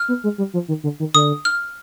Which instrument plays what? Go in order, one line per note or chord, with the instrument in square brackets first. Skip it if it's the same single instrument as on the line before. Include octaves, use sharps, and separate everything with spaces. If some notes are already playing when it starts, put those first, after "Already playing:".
Already playing: [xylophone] F6
[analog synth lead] B3
G#3
G3
F3
D#3
D3
D#3
[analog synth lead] D3 [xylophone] D#6
[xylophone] F6